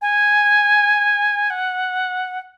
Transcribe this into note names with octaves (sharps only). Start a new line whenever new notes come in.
G#5
F#5